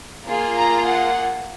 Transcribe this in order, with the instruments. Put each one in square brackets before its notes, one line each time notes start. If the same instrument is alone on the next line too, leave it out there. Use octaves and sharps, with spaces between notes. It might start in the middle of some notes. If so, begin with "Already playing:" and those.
[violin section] A#3 F4 G#4
A#5
F#5